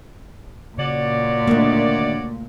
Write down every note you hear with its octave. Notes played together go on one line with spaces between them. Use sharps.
A#2 C#3 F#4 C#5 D5
D2 D#3 A3 A#3